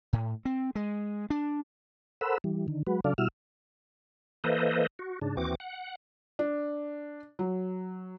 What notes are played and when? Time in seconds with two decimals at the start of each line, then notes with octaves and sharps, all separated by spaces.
0.13 A2
0.45 C4
0.75 G#3
1.30 D4
2.21 A4 A#4 C5 F#5 B5 E6
2.44 E3 G3
2.68 D3 D#3
2.87 F#3 G#3 F#4 B4
3.04 C#3 F#3 D4 A4 D5 F5
3.18 B2 G3 E4 F#4 E6 F6
4.44 E3 A#3 A4 B4 C5 D#5
4.99 F#4
5.22 G#2 C#3 D4
5.37 D#2 E3 C4 F#4 D6
5.60 F#5
6.39 D4
7.39 F#3